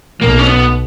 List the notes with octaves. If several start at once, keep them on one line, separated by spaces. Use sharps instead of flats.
B1 B2 A#3
C#4
B3